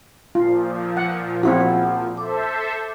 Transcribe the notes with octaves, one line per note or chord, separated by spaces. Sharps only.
A#2 F3 F4
F#5
C4 E4 F#4 G#4 F#5 B5
A4 C5 E5 D6